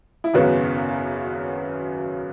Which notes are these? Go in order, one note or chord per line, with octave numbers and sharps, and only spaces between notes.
E4
G#1 F#2 C#3 F#3 B3 F#4